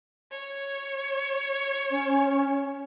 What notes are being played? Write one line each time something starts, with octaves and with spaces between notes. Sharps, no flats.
C#5
C#4